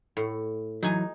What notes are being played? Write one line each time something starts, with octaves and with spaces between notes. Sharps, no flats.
A2
E3 F#3 D#4 G#5